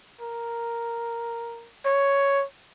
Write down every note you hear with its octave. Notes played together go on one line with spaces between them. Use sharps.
A#4
C#5